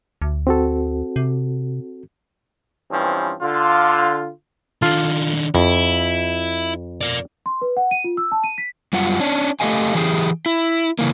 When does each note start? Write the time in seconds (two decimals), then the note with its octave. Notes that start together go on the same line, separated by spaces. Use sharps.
0.22 D2
0.47 C4 F#4 A4
1.16 C3
2.89 G2 E3 F3 C4 C#4
3.41 D3 F4
4.82 D#3 D4 F4 A4
5.55 F2 E4
7.01 A#4 D5
7.46 C6
7.61 B4
7.77 F#5
7.91 D#7
8.04 F4
8.17 E6
8.32 A5
8.44 D#7
8.58 B6
8.93 F#2 G3 F4 F#5
9.20 C#4 D4
9.60 A3 G4 A4 D#5 F5 G#5
9.95 E3 G4 G#4
10.46 E4
10.99 C#3 E3 A#3